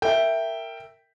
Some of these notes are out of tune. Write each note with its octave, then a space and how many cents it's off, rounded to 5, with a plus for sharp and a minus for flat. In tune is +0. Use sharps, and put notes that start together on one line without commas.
A#4 -20 E5 +0 G5 +0